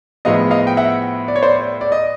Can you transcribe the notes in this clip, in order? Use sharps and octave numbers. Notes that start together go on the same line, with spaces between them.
A2 F3 G#3 B3 D#5 F5
D#5 F5
G5
E5 F#5
D5
C#5
C5 D5
D5
D#5